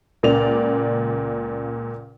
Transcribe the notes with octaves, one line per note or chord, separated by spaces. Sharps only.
C#2 A#2 C#3 D5 F7